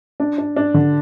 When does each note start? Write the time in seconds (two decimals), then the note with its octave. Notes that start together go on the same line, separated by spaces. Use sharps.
0.20 D4
0.38 D4
0.56 D4
0.74 D3